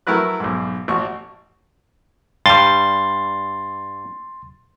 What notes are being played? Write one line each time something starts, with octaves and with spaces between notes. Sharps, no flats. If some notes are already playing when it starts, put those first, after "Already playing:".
F#3 A3 E4 A#4 B4 F#6
B1 G#2
A1 F#4 C#6
G2 G3 C6 A6